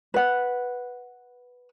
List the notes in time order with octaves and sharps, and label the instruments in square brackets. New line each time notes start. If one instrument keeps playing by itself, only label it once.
[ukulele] B4 F#5